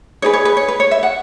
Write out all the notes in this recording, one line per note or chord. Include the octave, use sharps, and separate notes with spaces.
D#4 G#4 B4 C#5
C#5
B4
C#5
B4
C#5
E5
F#5